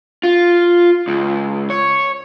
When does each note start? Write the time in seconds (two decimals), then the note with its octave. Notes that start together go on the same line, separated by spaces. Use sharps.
0.23 F4
1.08 C#2
1.70 C#5